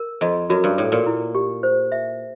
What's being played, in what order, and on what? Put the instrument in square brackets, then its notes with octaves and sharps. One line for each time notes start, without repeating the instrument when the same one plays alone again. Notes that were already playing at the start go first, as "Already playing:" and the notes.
Already playing: [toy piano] A#4
[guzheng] F2 [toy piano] D#5
[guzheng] F#2 [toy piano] F#4
[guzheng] G2
[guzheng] A2 [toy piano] A4
[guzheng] A#2
[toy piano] E4
G4
C5
E5